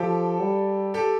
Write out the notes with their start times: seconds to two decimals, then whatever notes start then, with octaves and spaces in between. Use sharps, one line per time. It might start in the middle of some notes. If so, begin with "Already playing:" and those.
Already playing: F3 G4 A4
0.40 G3
0.94 G4 A4